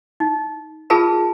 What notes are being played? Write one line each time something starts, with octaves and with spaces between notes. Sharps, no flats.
D#4
F4 G#4 A#4 B4 A5 B5